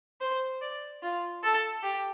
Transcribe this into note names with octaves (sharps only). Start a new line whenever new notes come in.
C5
D5
F4
A4
G4